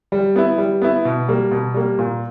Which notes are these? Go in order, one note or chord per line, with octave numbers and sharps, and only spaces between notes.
G3
B3 E4
G3
B3 E4
B2
G3 A#3
B2
G3 A#3
A#2